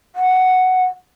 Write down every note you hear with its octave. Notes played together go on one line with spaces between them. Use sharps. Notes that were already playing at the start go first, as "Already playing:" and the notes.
F#5